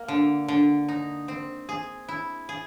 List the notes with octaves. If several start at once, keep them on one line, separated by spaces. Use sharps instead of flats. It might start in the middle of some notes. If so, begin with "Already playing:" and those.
Already playing: A#3
D3
D3
D#4
C4
G#4
E4
G#4